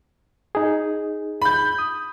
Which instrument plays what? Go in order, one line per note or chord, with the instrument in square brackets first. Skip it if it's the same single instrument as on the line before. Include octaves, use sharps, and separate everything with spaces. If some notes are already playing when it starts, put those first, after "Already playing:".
[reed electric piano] D#4 G#4
[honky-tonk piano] B5 G6
[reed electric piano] D#6